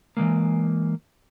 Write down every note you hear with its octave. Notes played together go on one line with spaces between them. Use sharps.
E3 F3 G#3 A#3